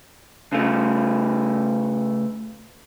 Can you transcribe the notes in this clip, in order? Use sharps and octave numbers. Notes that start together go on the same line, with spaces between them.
C#3 A3